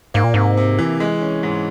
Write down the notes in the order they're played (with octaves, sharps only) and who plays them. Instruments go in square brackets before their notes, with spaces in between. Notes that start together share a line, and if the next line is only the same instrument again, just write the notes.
[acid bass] G#2 [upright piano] A#3
[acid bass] A#2
[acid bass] G#2 [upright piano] C3
[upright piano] C3
E3
G#3
C#4
G#2